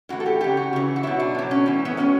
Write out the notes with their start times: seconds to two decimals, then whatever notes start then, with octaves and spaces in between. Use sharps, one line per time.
0.09 A2 E3 F#4
0.20 A4
0.26 G4
0.41 C#3 F#3 G4
0.57 F#4
0.73 C#3 E3
0.96 F#4
1.03 B2 F#3 E4
1.20 D4
1.35 B2 F#3
1.51 C#4
1.66 A2 E3
1.85 B3
1.97 A2 F#3 C#4